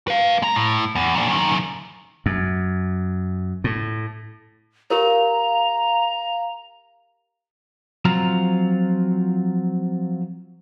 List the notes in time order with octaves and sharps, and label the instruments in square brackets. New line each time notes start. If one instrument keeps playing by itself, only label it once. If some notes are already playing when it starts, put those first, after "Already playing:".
[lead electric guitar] B4 F5
G#3 A#5
A2
E2
A#2 D4
F#2 D#3
[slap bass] F#2
A2
[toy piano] G4 A#4 C#5 [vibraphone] F5 [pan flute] A#5
[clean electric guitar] F3 F#3 C4 F4 F5 A#5